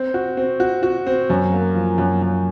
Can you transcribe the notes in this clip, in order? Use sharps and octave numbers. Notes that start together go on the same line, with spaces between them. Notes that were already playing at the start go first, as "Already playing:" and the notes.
Already playing: C4
F#4
C4
F#4
F#4
C4
F#2
A#3
F3
F#2
F#2